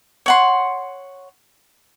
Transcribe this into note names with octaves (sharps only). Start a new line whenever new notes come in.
C#5 F#5 C6